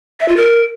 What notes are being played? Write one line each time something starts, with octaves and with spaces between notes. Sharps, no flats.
E5
F4
A#4